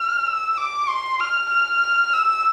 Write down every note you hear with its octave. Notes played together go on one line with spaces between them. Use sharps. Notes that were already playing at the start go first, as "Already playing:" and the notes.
Already playing: F6
E6
D6
C6
F6
F6
E6